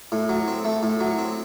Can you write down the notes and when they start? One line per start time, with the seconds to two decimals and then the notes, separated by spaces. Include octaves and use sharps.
0.12 A2
0.29 F#3
0.48 C4
0.65 A3
0.83 A2
1.00 F#3
1.18 C4